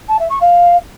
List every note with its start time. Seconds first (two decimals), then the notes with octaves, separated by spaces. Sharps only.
0.08 A5
0.19 E5
0.30 C#6
0.41 F5